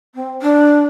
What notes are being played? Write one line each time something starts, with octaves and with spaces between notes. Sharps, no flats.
C4
D4